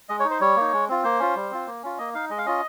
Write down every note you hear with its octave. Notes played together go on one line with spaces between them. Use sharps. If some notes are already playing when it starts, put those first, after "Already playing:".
G#3 D#5
C#5
D#4
C5
G3 C#5
A#3 D#4
G#3
C4 F4
A#3 C5
C#4 F4
G3
C4 F4
A#3
C#4 F4
A#3 D#5
D#4 F5
G#3 D#5
F5
C#4 F4 D#5